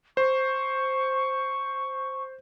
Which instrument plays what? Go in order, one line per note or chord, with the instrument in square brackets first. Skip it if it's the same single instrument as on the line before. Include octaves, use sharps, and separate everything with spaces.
[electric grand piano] C5 [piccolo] C#6